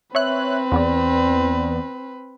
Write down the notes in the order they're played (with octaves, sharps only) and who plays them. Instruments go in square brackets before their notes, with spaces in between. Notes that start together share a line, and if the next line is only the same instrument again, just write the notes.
[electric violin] C4 B4 [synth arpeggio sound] C#5 E5 F#6
[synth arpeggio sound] E2 B3 D5